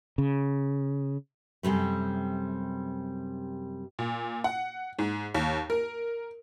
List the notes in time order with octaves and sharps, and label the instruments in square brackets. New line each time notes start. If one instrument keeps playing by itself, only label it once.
[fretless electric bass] C#3
[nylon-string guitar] F#2 C3 G3 A3
[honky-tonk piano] A#2
F#5
G#2
D#2
A#4